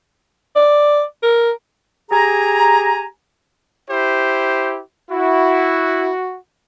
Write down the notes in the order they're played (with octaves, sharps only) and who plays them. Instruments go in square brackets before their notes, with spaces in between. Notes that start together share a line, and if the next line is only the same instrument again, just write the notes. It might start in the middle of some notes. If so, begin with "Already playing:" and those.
[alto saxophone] D5
A#4
[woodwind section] G4 G#4 G#5 A#5
[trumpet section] E4 G4 C5
[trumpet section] E4 [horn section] F#4